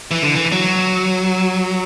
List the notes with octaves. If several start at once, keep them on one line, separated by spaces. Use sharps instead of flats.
E3
D3
E3
F#3